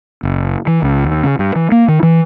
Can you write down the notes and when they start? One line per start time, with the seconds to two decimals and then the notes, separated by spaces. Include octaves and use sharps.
0.23 F#1
0.67 E3
0.82 C#2
1.04 D#2
1.23 C#3
1.39 G2
1.56 E3
1.72 A#3
1.88 D#3
2.03 E3